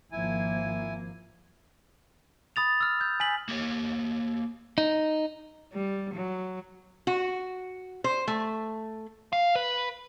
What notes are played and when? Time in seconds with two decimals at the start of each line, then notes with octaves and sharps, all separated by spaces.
0.12 G#1 F3 A#3 E4 G#5
2.56 B5 D#6 A6 F7
2.81 E6 F6
3.01 G6
3.20 G#5 B6 F#7
3.48 A#3 G4 C#5
4.78 D#4
5.73 G3
6.14 F#3
7.07 F#4
8.04 C5
8.28 A3
9.33 F5
9.55 B4